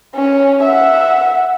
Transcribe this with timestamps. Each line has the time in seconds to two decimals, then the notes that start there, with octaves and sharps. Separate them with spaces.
0.15 C#4
0.63 E5 F#5